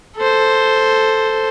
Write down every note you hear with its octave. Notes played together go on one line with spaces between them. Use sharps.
A4 C5